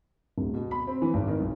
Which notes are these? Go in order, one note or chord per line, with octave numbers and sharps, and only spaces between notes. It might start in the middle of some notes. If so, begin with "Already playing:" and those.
D1
B2
B5
C4
E3
G#1
D#3
B1